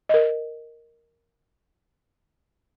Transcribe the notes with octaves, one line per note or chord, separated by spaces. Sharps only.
A#4 D#5